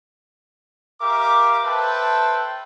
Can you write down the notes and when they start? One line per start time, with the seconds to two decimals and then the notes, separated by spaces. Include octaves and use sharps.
1.02 G4 A#4 E5 F5 D6
1.64 A4 B4 C5 E5 G5 A5